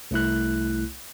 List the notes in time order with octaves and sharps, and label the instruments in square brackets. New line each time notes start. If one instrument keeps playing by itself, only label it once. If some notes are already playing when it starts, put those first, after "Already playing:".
[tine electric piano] C2 A3 E4 F#6